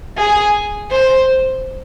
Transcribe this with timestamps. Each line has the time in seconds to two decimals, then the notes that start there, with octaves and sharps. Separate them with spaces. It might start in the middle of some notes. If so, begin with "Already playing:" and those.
0.18 G#4
0.91 C5